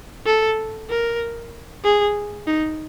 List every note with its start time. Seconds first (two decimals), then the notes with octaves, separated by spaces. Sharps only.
0.26 A4
0.89 A#4
1.84 G#4
2.47 D#4